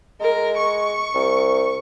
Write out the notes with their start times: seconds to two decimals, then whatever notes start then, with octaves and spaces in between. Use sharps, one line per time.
0.20 G#3 A#4
0.57 C#6
1.15 C2